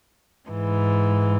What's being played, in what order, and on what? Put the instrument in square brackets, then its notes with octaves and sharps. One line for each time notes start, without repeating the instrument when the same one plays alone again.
[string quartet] G#2 E3